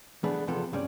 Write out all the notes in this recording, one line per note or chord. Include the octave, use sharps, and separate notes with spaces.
E3 A3 B3 D4 G#4 B4
E2 C3 F3 B3 A4
C#2 G2 G3 C#4 D5